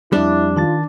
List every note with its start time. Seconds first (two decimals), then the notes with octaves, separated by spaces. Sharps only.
0.12 F2 G3 D4 E4
0.56 D#3 F4 A5 A6